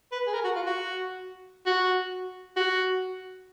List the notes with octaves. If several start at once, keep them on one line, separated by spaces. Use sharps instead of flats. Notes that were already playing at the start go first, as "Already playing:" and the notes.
B4
G#4
A#4
F#4
F4
F#4
F#4
F#4